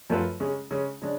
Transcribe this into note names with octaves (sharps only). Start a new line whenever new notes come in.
F#2 F3 A3 F4 B4
C#3 G#3 C#4
C#3 G#3 C#4
C#3 G#3 D4